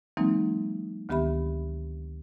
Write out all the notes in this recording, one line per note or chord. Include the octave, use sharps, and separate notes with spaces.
E3 F#3 G#3 A#3 C4 D#4
D2 D#3 B3 G4 E5 B5